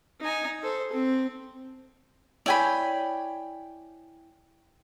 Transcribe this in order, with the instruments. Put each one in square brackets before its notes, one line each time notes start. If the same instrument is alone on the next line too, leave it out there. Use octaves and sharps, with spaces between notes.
[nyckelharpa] D#4 G#5
A4 C5
C4
[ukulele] E4 C#5 G#5 [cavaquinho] D5 G5 B5